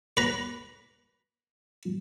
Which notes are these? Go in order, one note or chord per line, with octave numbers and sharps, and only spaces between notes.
B4 A#5